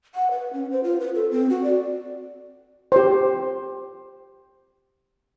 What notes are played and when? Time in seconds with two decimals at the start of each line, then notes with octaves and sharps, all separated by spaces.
0.15 F#5
0.31 B4
0.53 C#4
0.71 C5
0.84 F4
1.00 B4
1.15 A4
1.31 C4
1.50 F#4
1.64 D5
2.92 G4 C5